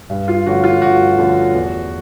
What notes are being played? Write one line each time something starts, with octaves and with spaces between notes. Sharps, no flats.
G2
F4
D3 F3 A3 C#4 F#4
F4
G2 F#4
D3 F3 A3 C#4
E2